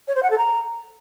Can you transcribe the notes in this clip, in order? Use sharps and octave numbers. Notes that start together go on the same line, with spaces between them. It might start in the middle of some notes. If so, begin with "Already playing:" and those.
C#5
C5
F#5
A4
A#5